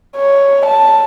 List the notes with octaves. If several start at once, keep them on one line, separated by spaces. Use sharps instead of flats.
C#5
A5